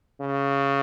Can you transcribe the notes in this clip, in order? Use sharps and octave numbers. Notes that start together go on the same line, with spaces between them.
C#3